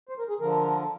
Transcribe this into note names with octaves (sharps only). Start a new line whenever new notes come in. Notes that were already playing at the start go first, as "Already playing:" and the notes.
C5
A#4
G#4
D3 F3 A#4